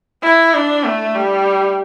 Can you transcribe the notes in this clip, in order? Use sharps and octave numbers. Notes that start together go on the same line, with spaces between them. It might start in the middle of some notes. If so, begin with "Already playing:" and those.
E4
D4
A3
G3